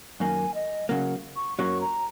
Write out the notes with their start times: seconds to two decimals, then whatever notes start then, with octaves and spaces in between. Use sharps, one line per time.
0.20 F#2 D#3 A#3 G#5
0.54 D#5
0.89 C#3 F#3 A#3 F#5
1.36 C#6
1.58 F#2 F#3 A#3 C#4 C#6
1.81 A#5